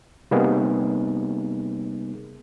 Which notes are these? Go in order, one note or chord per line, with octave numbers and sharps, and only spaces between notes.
C3 G3 A#3 B3 D#4 G#4